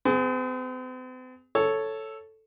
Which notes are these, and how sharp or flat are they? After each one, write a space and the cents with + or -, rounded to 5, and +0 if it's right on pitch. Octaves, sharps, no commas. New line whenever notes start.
C4 -45 G#4 +0
A4 +0 C#5 +0